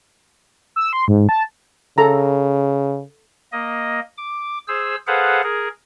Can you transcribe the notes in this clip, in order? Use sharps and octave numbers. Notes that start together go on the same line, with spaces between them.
E6
C6
G#2
A5
C#3 A4 A#5
A#3 D#5
D6
G#4 C5 E6
G#4 A4 B4 C5 F5 F#5
G#4 A#4